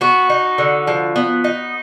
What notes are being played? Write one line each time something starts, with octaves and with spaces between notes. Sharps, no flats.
B3 F#4
D#4
D3
F3
B3
D#4